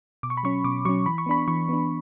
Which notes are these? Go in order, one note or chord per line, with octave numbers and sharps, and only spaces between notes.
B2 D6
C#6
B5
F#3 C#4 C#6
B2 D6
F#3 C#4 C#6
E3 B5
C#6
B3 D4 B5
E3 C#6
B3 D4